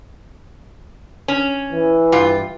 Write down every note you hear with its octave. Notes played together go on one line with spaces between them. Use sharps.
C#4
E3
G2 F4